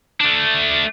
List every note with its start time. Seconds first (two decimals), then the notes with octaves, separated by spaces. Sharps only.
0.20 A3 D4